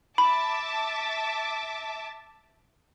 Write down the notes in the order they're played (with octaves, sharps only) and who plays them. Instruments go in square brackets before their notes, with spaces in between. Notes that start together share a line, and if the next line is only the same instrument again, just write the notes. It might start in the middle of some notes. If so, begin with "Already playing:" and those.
[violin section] E5 A5 D6 [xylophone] B5